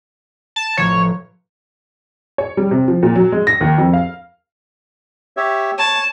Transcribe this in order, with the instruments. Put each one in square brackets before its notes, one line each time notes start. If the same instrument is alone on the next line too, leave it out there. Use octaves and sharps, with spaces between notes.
[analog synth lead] A5
[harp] A1 F3 [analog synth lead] C#5
[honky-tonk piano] C#5
G3
C3
F3
A#2
F#3
G#3
A#6
D#2
F2
F5
[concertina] G4 C#5 E5
[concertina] C#5 [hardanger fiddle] A5